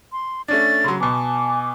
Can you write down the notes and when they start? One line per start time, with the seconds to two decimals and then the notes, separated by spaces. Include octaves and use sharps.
0.12 C6
0.48 A3 C#4 D4 A6
0.84 C#3 F#3 C6
1.00 B2 B3 G#5 A5 D6